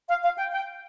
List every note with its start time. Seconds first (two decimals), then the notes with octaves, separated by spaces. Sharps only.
0.09 F5
0.23 F5
0.38 G5
0.52 G5